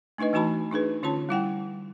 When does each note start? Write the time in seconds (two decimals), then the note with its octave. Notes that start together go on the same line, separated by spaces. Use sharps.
0.18 A3 D4 D#4 B4 D#5
0.33 E3 A3 D#4 F#4 A5 B5
0.71 D4 D#4 G#4 B4
1.03 D3 C#4 F4 C#5 A5
1.29 G3 E4 F#5 G5